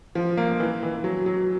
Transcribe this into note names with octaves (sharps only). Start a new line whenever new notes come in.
F3
A#3
E3
E3
F#3
F#3